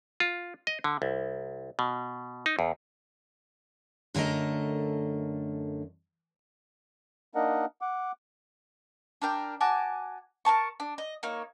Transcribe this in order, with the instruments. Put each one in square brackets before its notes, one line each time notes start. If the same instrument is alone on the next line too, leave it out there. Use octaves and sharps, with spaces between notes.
[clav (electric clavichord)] F4
D#5
D3
C2
B2
D#4
E2
[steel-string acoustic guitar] F#2 D3 A3 A#4 D#5
[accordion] A#3 D4 D#4 A#4 D#5 F#5
F#5 D6
[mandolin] D4 A#4 G5
F#4 G#5 A5 D6
A#4 C#5 A5 C#6
D4
D#5
A#3 D#4 C#5